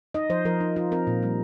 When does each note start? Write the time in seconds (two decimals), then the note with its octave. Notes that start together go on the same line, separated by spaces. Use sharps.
0.14 D#4 D#5
0.30 F3 C5
0.45 F3 A#4
0.61 D#4
0.76 D#4 F4
0.91 C4 A#4
1.07 A#2
1.23 G3